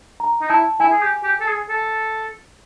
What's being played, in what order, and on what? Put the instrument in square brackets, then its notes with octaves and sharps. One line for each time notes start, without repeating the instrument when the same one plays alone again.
[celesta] A#5
[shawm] D#4
[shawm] E4 [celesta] A5
[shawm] E4 [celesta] G#5
[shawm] G#4
G4
G4
A4
G#4
A4